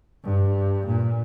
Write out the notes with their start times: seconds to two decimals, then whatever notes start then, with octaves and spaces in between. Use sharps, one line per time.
0.24 G2
0.87 A#2